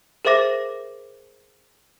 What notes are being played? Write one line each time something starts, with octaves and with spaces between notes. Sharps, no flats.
G#4 A#4 C5 E5 D6 A#6